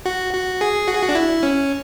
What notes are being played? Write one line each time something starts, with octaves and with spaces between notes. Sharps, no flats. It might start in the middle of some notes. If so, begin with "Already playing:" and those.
F#4
F#4
G#4
F#4
G#4
F#4
D4
E4
C#4